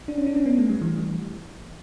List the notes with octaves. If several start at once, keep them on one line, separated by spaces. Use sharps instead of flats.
D4
C#4
D4
C#4
B3
A3
G3
E3